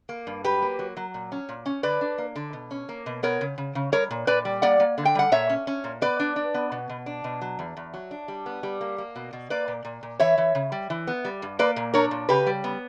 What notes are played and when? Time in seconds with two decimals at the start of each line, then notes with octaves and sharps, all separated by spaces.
0.09 A#3
0.27 G2
0.44 F#3 G4 B4
0.62 A#3
0.79 F#3
0.97 F#3
1.14 A#2
1.32 C#4
1.49 A#2
1.66 C#4
1.83 D3 B4 D5
2.01 D4
2.18 A#3
2.36 D3
2.53 B2
2.71 C#4
2.89 A#3
3.06 B2
3.23 B3 A#4 C#5
3.41 C#3
3.58 C#3
3.75 C#3
3.92 G3 A#4 C#5
4.11 A#2
4.27 A#2 B4 D5
4.45 G3
4.62 A#3 D5 F#5
4.80 A#3
4.98 D3
5.05 G5
5.15 G3 F#5
5.32 A#2 C#5 E5
5.50 C#4
5.67 C#4
5.84 A#2
6.02 B3 B4 D5
6.20 D4
6.36 D4
6.54 B3
6.72 B2
6.89 B2
7.06 D4
7.24 B2
7.41 F#3
7.59 E2
7.77 E2
7.94 F#3
8.11 D4
8.28 G3
8.46 B3
8.63 G3
8.81 A#3
8.98 A#3
9.16 B2
9.33 B2
9.50 A#3 B4 D5
9.68 A#2
9.85 A#2
10.03 A#2
10.20 E3 C#5 E5
10.38 E3
10.55 C#3
10.72 G3
10.90 E3
11.07 B3
11.25 G3
11.42 G2
11.59 A#3 B4 D5
11.76 A#2
11.94 D4 A#4 C#5
12.11 A#2
12.29 C#3 G4 B4
12.47 G3
12.64 B3